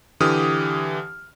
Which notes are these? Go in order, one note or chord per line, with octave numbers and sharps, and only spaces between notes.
D3 E3 G4 D#6 F6